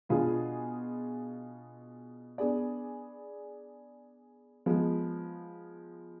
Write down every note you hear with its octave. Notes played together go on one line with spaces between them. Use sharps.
B2 B3 D4 F4 G#4
B3 D4 G#4 D5
F3 G#3 B3